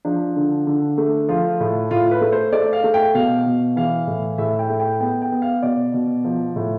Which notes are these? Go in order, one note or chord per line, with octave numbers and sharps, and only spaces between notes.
F3 D4
D3
D3
A3
F3 F4
A2
A2 F4
B4
A3
C5
A3 D5
F5
A3
G5
B2 F5
B2
E3 F5
A2
A2 E5
G5
A3
G5
B3 G5
G5
B3
F5
B2 D5
B2
F3
A2